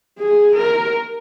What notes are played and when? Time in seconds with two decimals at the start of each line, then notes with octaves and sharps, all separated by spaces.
0.20 G#4
0.56 A#4